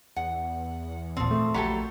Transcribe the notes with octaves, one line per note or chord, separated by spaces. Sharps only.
E2 F#5
G#1 D#2 A#2 F3 C4
A3
A#1 F#3 G4 A4 B5